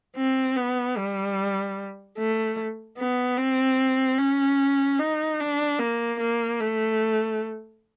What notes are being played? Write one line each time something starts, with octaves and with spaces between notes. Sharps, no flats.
C4
B3
G3
A3
B3
C4
C#4
D#4
D4
A#3
A#3
A3